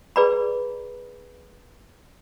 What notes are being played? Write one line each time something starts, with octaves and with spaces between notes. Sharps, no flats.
G#4 B4 D5 A#5 B5